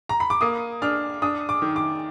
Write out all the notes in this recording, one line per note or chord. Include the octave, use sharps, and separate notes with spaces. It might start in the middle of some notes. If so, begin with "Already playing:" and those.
A#5
B5
D6
A#3 D#6
D4 F6
D4 D#6
D6
D#3
D6